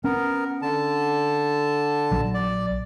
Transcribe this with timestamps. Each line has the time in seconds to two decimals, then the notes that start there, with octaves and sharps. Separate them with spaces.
0.04 B3 C#4 A#4
0.62 D3 A5
2.11 A#1 F#3
2.34 D5